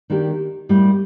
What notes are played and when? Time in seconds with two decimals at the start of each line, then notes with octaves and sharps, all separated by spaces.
0.10 D#3 A#3 D4 G4
0.69 A2 G3 A#3